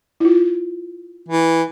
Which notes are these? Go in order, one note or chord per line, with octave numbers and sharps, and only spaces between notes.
E4 F4
E3